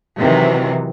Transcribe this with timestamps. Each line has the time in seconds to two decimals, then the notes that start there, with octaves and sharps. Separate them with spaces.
0.18 C3 D#3 E3 F#3